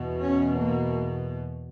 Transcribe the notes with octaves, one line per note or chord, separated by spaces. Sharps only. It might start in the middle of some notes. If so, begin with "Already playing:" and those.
Already playing: E2 B2
C#4
A#3